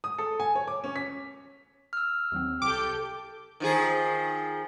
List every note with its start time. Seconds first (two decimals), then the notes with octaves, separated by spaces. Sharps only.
0.04 D#6
0.18 A4
0.40 G#5
0.55 C#5
0.68 D6
0.84 C#4
0.96 B6
1.93 E6 F6
2.32 D#2 F#3 C4
2.62 C2 G4 A4 D6 G6
3.60 D#3 F3 G#4